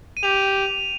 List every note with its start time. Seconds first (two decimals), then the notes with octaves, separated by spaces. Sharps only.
0.17 D#7
0.23 G4 F7